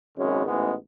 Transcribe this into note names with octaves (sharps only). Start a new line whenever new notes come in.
G#1 F#2 C#3 G#3 C#4
A1 G#2 E3 G#3 B3